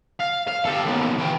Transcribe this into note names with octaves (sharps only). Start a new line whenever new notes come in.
F5
F5
G4 A4
D#2 B2
E3 G5